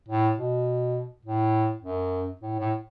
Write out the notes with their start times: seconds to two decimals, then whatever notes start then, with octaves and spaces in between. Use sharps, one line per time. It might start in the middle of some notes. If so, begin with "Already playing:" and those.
0.08 A2
0.37 B2
1.25 A2
1.83 F#2
2.41 A2
2.59 A2